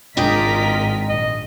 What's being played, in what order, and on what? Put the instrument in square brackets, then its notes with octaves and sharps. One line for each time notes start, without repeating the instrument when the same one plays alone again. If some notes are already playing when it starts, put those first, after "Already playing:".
[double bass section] G#1 [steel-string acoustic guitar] G#3 D4 G5 [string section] F4 A#4 B6 [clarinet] D#5
[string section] A#1 [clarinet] D#5